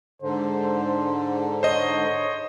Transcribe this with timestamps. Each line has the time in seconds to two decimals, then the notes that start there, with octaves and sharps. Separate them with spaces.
0.22 G#2 D3 C5
1.63 C5 C#5 D#5